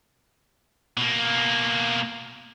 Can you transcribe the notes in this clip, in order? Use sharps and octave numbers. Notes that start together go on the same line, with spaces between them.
B2 A#3